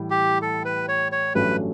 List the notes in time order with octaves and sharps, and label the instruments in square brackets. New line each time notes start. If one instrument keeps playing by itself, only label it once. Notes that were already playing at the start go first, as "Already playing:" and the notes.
Already playing: [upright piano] A2 E3 G3
[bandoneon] G4
A4
B4
C#5
C#5
[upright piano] A1 G2 F#3 A3 C#4 [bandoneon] B4